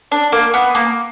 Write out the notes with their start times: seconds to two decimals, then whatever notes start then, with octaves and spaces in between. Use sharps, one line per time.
0.12 D4
0.32 A#3
0.54 B3
0.75 A#3